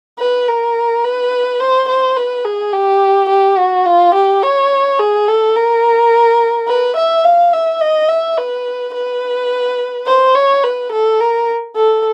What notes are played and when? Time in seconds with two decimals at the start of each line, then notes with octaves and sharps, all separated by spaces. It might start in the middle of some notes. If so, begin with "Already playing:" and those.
0.19 B4
0.48 A#4
1.04 B4
1.60 C5
1.88 C5
2.16 B4
2.45 G#4
2.73 G4
3.29 G4
3.57 F#4
3.86 F4
4.14 G4
4.43 C#5
4.99 G#4
5.27 A4
5.56 A#4
6.68 B4
6.96 E5
7.25 F5
7.53 E5
7.81 D#5
8.09 E5
8.37 B4
8.94 B4
10.07 C5
10.35 C#5
10.63 B4
10.92 A4
11.20 A#4
11.76 A4